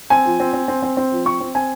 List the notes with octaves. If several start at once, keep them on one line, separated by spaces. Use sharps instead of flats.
C4 G#5
F3
C4
C4
C4
C4
C4
F3
C4 C#6
C4
C4 G#5